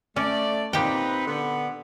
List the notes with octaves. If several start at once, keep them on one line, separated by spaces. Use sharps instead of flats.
A3 C#4 D5
A#2 C4 D#4 G4 B4 G5
D3 B3